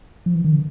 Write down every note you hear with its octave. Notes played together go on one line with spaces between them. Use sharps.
F3
E3
D#3
D3